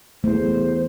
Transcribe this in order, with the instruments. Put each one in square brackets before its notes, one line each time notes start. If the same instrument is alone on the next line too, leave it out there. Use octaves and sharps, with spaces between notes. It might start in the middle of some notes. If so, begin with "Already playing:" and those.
[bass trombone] E2 [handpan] A3 [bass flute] C5